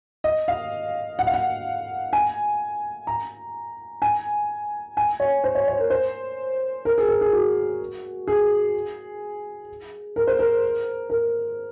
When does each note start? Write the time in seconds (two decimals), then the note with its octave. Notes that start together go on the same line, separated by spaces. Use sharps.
0.24 D#5
0.48 F5
1.19 F#5
1.27 F5
1.34 F#5
2.13 G#5
3.07 A#5
4.02 G#5
4.97 G#5
5.20 C#5
5.44 C5
5.55 C#5
5.68 C#5
5.79 A#4
5.90 C5
6.85 A#4
6.98 G#4
7.08 A#4
7.21 G#4
7.33 F#4
8.28 G#4
10.16 A#4
10.27 C5
10.39 A#4
11.10 A#4